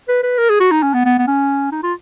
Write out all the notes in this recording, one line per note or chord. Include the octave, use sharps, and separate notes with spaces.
B4
B4
A#4
G#4
F#4
D#4
C#4
B3
B3
B3
C#4
D#4
F4